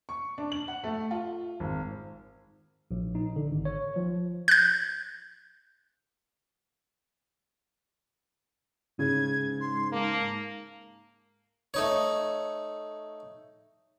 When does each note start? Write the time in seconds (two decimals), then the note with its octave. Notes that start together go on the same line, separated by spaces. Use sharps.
0.09 C#6
0.38 D4
0.52 F#7
0.68 F#5
0.84 A3
1.11 F4
1.60 G#1
2.91 A#1
3.15 D#4
3.36 D3
3.51 G#1
3.65 C#5
3.96 F3
4.48 F#6 G6
8.99 G#2 C#3 G#6
9.60 C6
9.92 A#3 A5
11.74 A3 D#4 C#5